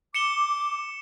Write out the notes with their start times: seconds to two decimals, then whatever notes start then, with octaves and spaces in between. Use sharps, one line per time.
0.14 D6 C#7 E7 G7